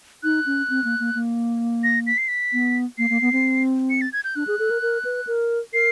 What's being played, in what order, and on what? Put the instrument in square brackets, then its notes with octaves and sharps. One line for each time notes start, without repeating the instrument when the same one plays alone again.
[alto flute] D#4 [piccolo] F#6
[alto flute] C#4
C4
A#3
A#3
A#3
[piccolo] A#6
B6
C7
B6
[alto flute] B3
[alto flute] A#3 [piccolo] C7
[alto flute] A#3
B3
C4
[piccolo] C#7
A6
G#6
G6
[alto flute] D4 [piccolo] F#6
[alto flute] G#4
A4
A#4
A#4
B4
A#4
[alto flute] A#4 [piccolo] C7